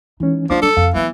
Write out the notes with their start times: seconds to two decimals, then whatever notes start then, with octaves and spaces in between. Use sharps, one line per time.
0.20 E3 G#3 C#4 D#4
0.50 F3 B3 D4 D#4 D6
0.62 F#3 A4
0.77 F2 F5
0.94 E3 F#3 B3